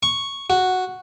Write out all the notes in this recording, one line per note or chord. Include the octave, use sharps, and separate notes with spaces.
C#6
F#4